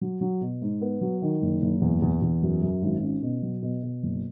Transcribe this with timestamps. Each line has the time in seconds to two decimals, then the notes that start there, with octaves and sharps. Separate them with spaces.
0.01 F#3
0.21 F#3
0.41 B2
0.62 G#2
0.81 B3
1.01 F#3
1.22 D#3
1.42 F#1
1.62 F#1
1.81 E2
2.02 E2
2.22 E2
2.43 F#2
2.62 F#2
2.82 G#1
3.03 C#4
3.22 B2
3.43 F#3
3.62 B2
3.83 B2
4.03 F#1